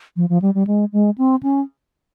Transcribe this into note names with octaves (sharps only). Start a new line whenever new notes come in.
F3
F3
G3
G3
G#3
G#3
C4
C#4